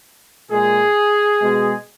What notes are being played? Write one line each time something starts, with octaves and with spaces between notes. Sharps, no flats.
A#2 G#3 G#4
B2 G#3